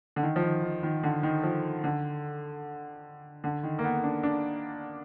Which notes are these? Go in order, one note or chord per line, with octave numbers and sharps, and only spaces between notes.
D3
D#3
F3
D#3
D#3
D#3
D3
D#3
F3
D3
D3
D#3
A#3
B3
D4
D4